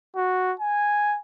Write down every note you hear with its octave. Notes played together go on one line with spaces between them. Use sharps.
F#4
G#5